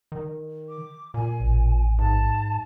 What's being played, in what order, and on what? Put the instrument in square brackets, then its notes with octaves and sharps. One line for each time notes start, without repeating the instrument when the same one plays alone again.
[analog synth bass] D#3
[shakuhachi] D6
[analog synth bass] A#2 [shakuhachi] G#5
[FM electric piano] A1
[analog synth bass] G#2 [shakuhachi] A5